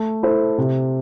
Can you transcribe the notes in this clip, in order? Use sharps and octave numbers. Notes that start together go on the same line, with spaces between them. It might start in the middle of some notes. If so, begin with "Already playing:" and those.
Already playing: A3
E4 A4 C5
C3